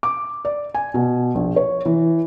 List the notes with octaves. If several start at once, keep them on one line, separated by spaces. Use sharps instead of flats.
D6
D5
G#5
B2
A#1
C#5
E3